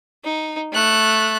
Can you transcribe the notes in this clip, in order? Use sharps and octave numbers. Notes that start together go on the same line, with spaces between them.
D#4
A3 F#6